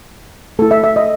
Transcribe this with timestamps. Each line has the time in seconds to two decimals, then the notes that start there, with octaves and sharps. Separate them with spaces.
0.59 A3 E4 A4
0.71 E5
0.84 E5
0.96 D#5